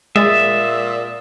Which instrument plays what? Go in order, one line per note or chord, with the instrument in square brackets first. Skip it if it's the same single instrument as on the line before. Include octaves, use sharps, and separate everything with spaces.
[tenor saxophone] A#2 [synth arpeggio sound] G#3 [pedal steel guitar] E5 [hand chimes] D#6 A6